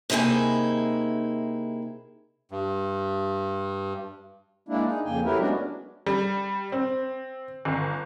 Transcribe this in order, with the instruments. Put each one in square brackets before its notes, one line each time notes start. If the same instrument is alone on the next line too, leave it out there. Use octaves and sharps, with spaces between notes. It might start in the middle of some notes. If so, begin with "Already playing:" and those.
[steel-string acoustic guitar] C3 A#3 D#4 E4 G#4
[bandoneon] G2
[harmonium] G#3 A#3 D4 E4
D#4 G#4
F2 C#3 A#3 G5 G#5
F#3 A3 E4 G4 A#4 B4
G#3 B3 C#4 D4 F#4
[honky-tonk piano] G3
C4
G1